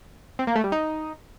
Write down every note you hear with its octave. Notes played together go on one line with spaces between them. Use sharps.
C4
A#3
A3
G3
D#4